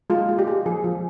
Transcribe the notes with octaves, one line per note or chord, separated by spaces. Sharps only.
G#3 F4
G#3
G4
G#3
F3 G#4
F3